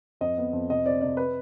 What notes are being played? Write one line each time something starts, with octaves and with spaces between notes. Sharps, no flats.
F2 D#5
B3
F2
C3 D#5
C4 D5
C3 D5
B4